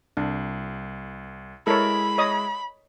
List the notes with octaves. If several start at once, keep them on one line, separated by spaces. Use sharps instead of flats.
C2 D4
G#3 E4 A4 A#4 C#5 B5
C#5 D#5 D#6